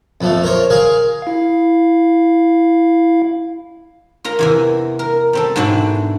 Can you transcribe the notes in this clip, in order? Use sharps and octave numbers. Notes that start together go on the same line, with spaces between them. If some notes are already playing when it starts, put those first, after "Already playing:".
F2 F3 A3
A#4 C5 C#5
G#4 A#4 F5 G#5
E4 F5
F4 A#4 A#5
E2 C3 E3
A#4
G3 C4 A4
G#2 B2 C4 D4 E4 F#4